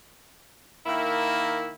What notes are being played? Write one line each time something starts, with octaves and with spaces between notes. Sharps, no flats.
D#3 A#3 E4